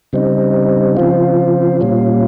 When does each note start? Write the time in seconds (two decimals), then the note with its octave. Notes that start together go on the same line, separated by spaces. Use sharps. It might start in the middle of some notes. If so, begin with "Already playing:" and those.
0.13 C#3 G3 C4 D#4
0.97 C#3 F3 C4 F4
1.81 A#2 G3 C#4 F4